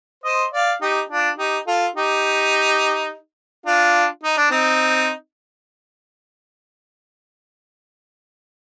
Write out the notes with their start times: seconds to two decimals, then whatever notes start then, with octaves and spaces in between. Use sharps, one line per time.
0.24 C5 D#5
0.53 D5 F5
0.81 D#4 G4
1.10 D4 F4
1.38 D#4 G4
1.67 F4 A4
1.95 D#4 G4
3.66 D4 F4
4.23 D#4
4.37 D4
4.51 C4 D#4